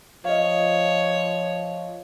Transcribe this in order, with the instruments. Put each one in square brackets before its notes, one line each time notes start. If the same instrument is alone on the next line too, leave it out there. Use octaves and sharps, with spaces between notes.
[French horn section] F3 [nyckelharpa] C#5 [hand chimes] D#5 F5